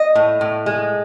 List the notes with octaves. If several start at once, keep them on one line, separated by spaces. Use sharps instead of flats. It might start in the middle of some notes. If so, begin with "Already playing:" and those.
Already playing: D#5
A2
A2
G#3